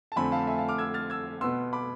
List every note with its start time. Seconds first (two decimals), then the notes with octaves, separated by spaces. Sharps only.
0.12 A5
0.16 F2 D3 A3 C4 G#5 B5
0.32 F5 A5
0.47 E5 G#5
0.58 F5 A5
0.68 D6 F6
0.78 E6 G#6
0.94 F6 A6
1.10 E6 G#6
1.41 B2 B3 C6 E6
1.73 B5 D6